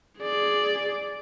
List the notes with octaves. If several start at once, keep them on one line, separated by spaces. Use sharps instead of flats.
G#4 D5